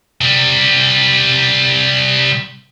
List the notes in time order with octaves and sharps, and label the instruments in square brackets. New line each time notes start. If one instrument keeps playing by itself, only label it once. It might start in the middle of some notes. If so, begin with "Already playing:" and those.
[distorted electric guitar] C3 G3